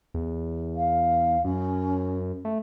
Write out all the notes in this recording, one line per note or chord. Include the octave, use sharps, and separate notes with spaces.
E2
F5
F#2 C#4
A3